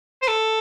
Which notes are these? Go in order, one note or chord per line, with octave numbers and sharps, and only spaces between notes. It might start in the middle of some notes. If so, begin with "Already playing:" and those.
C5
A4